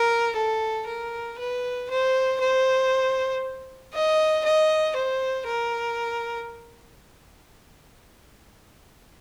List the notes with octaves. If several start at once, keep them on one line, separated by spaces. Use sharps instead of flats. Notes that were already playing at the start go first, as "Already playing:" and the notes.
Already playing: A#4
A4
A#4
B4
C5
C5
D#5
D#5
C5
A#4